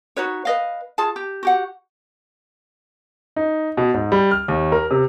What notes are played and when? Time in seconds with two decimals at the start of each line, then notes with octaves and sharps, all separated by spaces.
0.16 D#4 F#4 B4 C#5
0.45 B4 D#5 F5
0.98 F4 G#4 A5
1.16 G4
1.43 F#4 G4 F#5
3.36 D#4
3.77 B2
3.94 G#2
4.12 G3
4.31 F6
4.48 D#2
4.72 A#4
4.91 C3